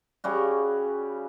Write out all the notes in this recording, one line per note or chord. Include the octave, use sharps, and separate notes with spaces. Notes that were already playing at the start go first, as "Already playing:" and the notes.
C#3 G3 F#4